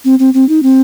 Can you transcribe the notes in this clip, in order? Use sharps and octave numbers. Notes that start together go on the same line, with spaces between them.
C4
C4
C4
D#4
C4